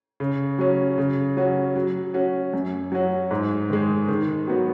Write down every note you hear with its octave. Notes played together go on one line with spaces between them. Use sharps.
C#3
F#3 C#4
C#3
F#3 C#4 F#4
F#3
C#4 F#4
F#2
F#3 C#4 F#4
G#2
D#3 G#3
D#3
F#3 B3 F#4